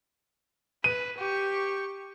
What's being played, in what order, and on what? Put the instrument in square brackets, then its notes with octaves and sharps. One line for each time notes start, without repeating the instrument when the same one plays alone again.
[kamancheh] B4 [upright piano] D#7
[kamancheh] G4 C#6